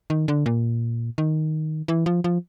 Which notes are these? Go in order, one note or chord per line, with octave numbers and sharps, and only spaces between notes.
D#3
D3
A#2
D#3
E3
F3
F3